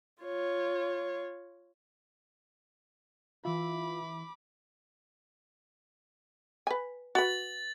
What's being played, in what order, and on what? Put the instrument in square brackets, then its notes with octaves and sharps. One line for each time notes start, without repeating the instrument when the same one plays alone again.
[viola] F4 C#5
[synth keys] E3 E5 [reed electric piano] F4 [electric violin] B5 D6
[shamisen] B4 G#5
[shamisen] F#4 B4 [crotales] A6 F#7